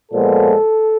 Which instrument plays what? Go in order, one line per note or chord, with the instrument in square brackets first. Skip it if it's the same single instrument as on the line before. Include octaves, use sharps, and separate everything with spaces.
[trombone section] A#2 F3 G#3 B3 A4